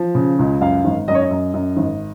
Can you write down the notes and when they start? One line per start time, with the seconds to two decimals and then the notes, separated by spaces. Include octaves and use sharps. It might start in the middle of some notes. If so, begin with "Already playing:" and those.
Already playing: F3
0.15 C#3
0.39 C#2
0.61 F#2 F5
0.85 G#1
1.08 F#2 D#5
1.14 C#5
1.22 D#5
1.31 F#2
1.54 F#2
1.77 G#1